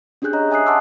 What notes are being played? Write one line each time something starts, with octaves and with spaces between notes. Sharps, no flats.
C#4 D4 G4 G#4 F#6 G6
C#5 D#5 A#5
E5 G#5 D#6 F#6 C7
D#5 F#5 A5 C6 D6 E6